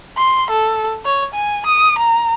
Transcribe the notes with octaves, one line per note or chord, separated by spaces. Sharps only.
C6
A4
C#5
G#5
D#6
A#5